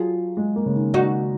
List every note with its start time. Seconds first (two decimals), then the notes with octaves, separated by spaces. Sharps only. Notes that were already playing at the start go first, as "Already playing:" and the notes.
Already playing: F#3 F4 G#4
0.37 G#3
0.56 A#3
0.66 C#3
0.75 D#3
0.94 D#4 F#4